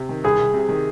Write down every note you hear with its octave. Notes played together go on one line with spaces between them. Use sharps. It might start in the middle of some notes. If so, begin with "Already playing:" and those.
Already playing: C3
D#3
C2 G#4
C2
C3
D#3